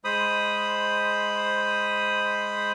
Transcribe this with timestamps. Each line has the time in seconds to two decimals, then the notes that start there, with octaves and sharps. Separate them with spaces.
0.05 G#3 C5 B5 D#6